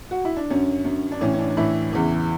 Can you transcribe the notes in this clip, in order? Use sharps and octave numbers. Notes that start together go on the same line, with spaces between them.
F#4
E4
D4
F#2 D3 C#4
F#2 D3
D4
A2 E3 C#4
C#4
D4
D4
A2 E3 E4
E2 C#3 E3